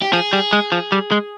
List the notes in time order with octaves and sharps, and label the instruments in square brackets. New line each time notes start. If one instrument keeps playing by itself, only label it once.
[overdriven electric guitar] G4
[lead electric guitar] F3 [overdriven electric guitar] G#4
[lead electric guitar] G3
G#3
F3
G3
G#3